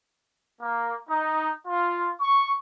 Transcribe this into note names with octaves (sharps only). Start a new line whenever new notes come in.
A#3
D#4
F4
C#6